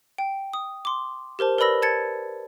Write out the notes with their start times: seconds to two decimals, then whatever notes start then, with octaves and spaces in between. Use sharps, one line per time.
0.18 G5
0.53 D#6
0.85 C6 D6
1.39 G4 A#4 C5 A5
1.58 A#4 B4 D5 B5 E6 A#6
1.82 A5 G#6 A6 C#7